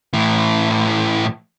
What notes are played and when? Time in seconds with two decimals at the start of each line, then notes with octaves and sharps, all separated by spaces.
0.13 A2 E3